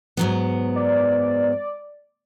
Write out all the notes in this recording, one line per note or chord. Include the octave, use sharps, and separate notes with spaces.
G#2 F#3 B3
D5